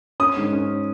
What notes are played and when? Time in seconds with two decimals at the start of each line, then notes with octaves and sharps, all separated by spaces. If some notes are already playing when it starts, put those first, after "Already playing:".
0.20 C#4 D#6
0.37 G#2
0.53 C#4